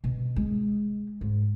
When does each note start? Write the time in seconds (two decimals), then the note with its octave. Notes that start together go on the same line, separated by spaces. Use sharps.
0.04 B2
0.36 G#3
1.21 G#2